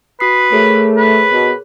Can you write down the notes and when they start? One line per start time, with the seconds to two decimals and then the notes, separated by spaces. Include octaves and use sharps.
0.20 F#4 B4 D#6 C7
0.52 A3 G#4 A#4 C#5
0.97 B4
1.31 B2